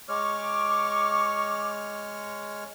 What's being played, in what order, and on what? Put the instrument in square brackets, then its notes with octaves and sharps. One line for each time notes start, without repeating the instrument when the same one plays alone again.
[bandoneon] G#3 C#5 F6 [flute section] C#6 D6